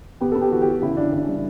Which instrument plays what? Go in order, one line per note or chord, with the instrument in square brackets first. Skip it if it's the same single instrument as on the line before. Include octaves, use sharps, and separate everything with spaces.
[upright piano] B3 G4
B3 A4
G4
E3 F#4
E3 G4
F#4
C#3 E4
C#3 D4
C#3 D4
C#4
G3 D4